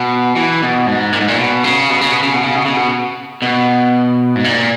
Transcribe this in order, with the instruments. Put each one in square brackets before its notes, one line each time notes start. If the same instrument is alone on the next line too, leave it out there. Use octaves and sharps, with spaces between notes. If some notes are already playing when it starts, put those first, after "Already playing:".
Already playing: [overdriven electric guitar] B2
E3
B2
G#2
A#2
G#2
A#2
B2
C#3
B2
C#3
B2
C#3
B2
C#3
B2
C#3
B2
B2
G#2
A#2